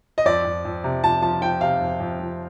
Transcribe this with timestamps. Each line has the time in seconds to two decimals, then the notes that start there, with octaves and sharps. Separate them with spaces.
0.18 D#5
0.25 F2 D5
0.45 F2
0.65 F2
0.84 C3
1.03 F3 A5
1.22 F3 A5
1.42 F3 G5
1.61 C3 F5
1.81 F2
2.00 F2
2.20 F3